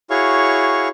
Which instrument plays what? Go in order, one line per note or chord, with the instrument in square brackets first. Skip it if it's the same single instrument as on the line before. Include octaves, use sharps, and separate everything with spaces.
[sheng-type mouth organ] E4 F#4 G#4 C#5 F5 C#6